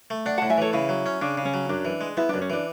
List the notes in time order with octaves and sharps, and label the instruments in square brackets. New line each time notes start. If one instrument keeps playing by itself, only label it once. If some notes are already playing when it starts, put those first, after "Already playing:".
[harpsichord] A3
[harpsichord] D4 [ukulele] D5 F#5
[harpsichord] A2 [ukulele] F#5 A5
[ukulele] E5 G#5
[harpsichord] E3 [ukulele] A4 C#5
[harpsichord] C#3 [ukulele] E4
[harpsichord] F#3
C#4
[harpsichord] C#3 [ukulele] D4
[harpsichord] C#3
[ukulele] C#4
[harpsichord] F#3
[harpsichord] F#2 [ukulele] D4
[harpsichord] E3
G#3
[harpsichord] B3 [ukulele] E4
[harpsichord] F#2 [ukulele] D4
[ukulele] C#4
[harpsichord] E3 [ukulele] D4